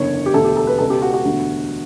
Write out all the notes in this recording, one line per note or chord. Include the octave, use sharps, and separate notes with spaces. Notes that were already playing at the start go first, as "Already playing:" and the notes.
Already playing: F#1 E2 D3 C#5
G4
E1 D2 D3 A4
G4
A4
B4
C#2 B2 A4
G4
F#4
F#4
E1 D2 D3